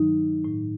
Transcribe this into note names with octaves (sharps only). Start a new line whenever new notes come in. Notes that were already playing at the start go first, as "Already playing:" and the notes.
Already playing: G2 D#3 F#3 D#4
A2 F#3